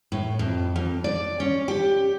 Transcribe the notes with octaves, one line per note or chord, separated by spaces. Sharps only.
A2
F2
F2
D5
C#4
G4